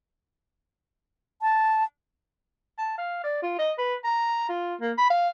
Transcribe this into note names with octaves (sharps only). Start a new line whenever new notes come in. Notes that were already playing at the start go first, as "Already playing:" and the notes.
A5
A5
F5
D5
F4
D#5
B4
A#5
F4
A#3
B5
F5